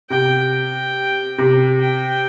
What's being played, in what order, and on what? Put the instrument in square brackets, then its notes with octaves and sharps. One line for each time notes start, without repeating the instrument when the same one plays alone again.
[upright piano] C3 [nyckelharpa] G5
[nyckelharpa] G5
[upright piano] C3
[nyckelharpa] G5